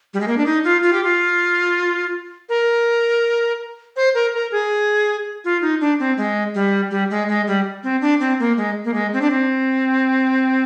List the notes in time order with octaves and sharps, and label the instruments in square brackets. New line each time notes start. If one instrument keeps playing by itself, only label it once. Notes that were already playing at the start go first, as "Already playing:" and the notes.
[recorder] G3
G#3
A#3
D4
D#4
F4
F4
G4
F4
A#4
C5
A#4
A#4
G#4
F4
D#4
D4
C4
G#3
G3
G3
G#3
G#3
G3
C4
D4
C4
A#3
G#3
A#3
G#3
C4
D4
C4